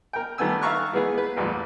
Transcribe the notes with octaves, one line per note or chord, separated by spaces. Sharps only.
A#4 G5
D#3 G3 A3 B3 G#5 E6
E5 F5 A#5 C#6 F6 F#6
E3 G#3 B3 G#4 B4
B4
A1 E2 A#2 G3